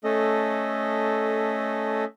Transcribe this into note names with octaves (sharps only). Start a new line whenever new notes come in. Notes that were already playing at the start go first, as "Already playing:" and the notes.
A3 C#4 A4 D#5